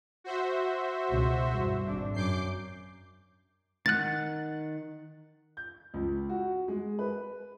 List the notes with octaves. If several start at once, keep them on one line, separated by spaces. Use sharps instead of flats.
F#4 C5 E5
C#2 B2
E2 G2
G#1 D4
F#2 D6 G6 C7
D#3 F#5 F#6 A6
G6
C#2
F#4
G#3
B4